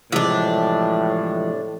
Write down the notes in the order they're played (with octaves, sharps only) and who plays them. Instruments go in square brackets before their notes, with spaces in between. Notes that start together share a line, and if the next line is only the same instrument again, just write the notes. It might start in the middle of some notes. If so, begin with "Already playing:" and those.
[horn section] A2 [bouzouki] C3 D4 [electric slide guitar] E3 F3 G#3